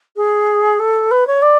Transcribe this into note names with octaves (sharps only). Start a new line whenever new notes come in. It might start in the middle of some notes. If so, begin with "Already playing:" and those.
G#4
A4
B4
C#5
D5